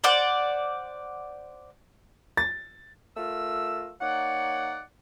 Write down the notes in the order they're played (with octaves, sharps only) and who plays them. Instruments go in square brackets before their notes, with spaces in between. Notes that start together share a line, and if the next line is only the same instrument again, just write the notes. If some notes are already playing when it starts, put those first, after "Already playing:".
[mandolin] C5 D5 F#5
[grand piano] A6
[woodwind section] A3 F4 A#4 E6
A#3 D#4 C#5 D5 F#5